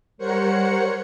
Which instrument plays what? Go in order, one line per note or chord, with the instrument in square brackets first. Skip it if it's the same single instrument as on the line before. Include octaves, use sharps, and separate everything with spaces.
[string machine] G3 A#4 C5 C#5 F#5 C#7